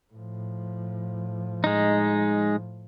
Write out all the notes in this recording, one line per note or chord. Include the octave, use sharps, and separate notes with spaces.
A2 F3
G#3 D#4